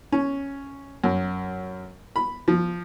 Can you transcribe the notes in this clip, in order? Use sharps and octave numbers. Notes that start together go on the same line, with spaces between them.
C#4
F#2
B5
F3